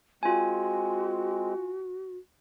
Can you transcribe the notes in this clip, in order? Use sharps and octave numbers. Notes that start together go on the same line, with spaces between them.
G#3 C4 F4 F#4 G#5